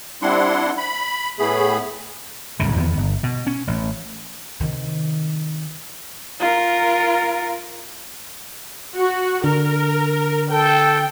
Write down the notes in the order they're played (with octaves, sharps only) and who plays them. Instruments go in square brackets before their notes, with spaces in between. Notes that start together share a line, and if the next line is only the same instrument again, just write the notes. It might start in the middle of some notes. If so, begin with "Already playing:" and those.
[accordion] G3 C4 D4 E4 F#5 C6
B5
A2 A3 B3 G#4 B5
[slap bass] D1 C2 F#2 C#3
E2 D#3 B3
G1
B2
C#4
A1
[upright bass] C3 D#3
[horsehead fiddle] F4 A#4
[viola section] F#4
[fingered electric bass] D3 [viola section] A#4
[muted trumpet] A4 [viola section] G5